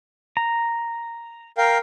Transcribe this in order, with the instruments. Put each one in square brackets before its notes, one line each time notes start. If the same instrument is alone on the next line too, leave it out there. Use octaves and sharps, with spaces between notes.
[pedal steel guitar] A#5
[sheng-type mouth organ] A#4 F5 G5